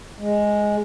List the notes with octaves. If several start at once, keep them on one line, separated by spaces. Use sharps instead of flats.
G#3